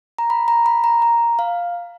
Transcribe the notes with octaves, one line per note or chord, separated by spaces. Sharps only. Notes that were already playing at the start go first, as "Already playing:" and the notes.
A#5
B5
A#5
B5
A#5
A#5
F5